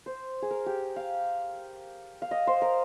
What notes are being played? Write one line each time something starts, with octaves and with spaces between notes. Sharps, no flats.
C5
G#4
A#4
G4
F5
F5
D#5
C5
A#4